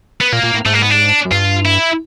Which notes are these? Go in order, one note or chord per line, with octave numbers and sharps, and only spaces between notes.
B3
A#2 A#3
A#2
A2
G#2 A3
A#3
B3
D4
F#2
G2 F4
E4